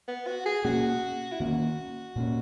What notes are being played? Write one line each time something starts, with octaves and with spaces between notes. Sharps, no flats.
B3
F#4
G#4
B2 A#3 C#4 F#4
E4
D#3 A#3 C#4 F#4
A#2 A#3 C#4